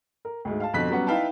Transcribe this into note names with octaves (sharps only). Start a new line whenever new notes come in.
A#4
D2 G#2
F5 A5
F2 B2 D3 F#6 B6
F#3 G3 B3 C#4 F#5
D#4 E4 B4 F5 G5 A5